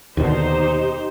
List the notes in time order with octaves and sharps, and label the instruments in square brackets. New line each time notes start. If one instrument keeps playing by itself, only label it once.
[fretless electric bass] D#2 B2 D3 [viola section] D#4 G4 C5